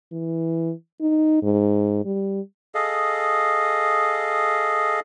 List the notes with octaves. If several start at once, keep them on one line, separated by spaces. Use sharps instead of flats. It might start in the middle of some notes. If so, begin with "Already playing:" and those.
E3
D#4
G#2
G3
G#4 A4 D#5 F5